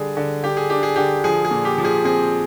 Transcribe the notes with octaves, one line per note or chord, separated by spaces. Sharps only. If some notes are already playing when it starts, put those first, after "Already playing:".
Already playing: D3 G3 G#4
D3
D3 G4
G#4
D4 G4
G#4
D3 G4
F3 G#4
G#4
A#2
G4
F3
G#4
C4 G#4